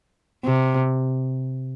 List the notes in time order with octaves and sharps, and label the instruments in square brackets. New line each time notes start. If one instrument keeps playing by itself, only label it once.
[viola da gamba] C3